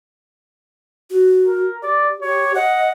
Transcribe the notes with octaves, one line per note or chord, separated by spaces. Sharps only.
F#4
A#4
G4 D5
G4 C#5
D#5 F#5